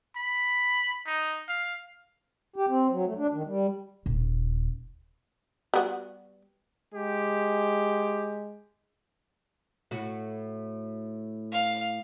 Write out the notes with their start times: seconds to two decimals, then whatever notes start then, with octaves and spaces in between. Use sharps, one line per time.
0.16 B5
1.07 D#4
1.48 F5
2.56 G4
2.69 C4
2.91 F#3
3.05 A3
3.17 D4
3.33 D#3
3.47 G3
4.06 D#1
5.74 G3 B3 F#4
6.94 G#3 G4
9.91 A2 F#4
11.53 F5